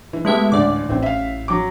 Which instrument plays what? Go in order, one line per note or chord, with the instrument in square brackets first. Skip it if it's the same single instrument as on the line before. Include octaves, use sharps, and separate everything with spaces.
[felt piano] E3
[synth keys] G#3 E4 E5 [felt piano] A3 B3 G4
[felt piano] A1 D2 [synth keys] D5 D6
[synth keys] A1 A2 [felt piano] E3 C4
[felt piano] E5 F5
F#3 D6